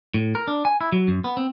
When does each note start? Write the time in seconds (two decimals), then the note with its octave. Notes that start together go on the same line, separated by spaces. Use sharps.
0.14 A2
0.35 A#4
0.48 D4
0.65 G#5
0.81 E4
0.92 F#3
1.08 F#2
1.24 B3
1.37 C4